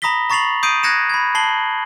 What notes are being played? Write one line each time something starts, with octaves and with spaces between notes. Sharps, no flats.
A#5 B5 D#6 A#6 B6 G7
A#5 C#6 A6 C7 F7 F#7
D#6 G6 C7 D7 D#7
F#6 G#6 A#6 C#7 E7
B5 G#6
A5 C7 F#7 G7